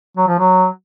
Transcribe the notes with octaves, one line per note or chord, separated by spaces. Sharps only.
F#3
F3
F#3